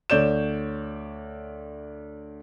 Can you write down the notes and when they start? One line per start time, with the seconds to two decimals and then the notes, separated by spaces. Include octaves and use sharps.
0.10 D2 C#5 D5 G6 E7